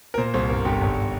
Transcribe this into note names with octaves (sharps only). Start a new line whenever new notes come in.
A#4
A#2 C5
C2 C5
G1 A#4
G1 G4
G#1